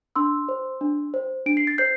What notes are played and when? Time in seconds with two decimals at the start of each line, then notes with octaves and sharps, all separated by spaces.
0.16 D4 C6 E6
0.49 C5
0.81 D4
1.14 C5
1.46 D4 D7
1.57 C7
1.67 A6
1.78 C5 G6 C7